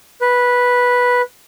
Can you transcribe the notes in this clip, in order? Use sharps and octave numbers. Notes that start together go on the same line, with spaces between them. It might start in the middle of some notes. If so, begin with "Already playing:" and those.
B4